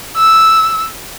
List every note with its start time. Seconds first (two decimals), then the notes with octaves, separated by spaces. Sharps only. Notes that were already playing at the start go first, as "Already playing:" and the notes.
0.17 E6